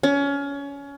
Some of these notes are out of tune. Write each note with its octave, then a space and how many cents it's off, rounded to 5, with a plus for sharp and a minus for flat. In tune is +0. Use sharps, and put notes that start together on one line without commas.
C#4 +25